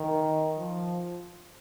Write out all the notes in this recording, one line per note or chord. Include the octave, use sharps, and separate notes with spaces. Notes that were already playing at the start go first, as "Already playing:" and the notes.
Already playing: D#3
F3